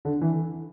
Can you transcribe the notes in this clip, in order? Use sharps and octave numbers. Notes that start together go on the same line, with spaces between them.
D3
E3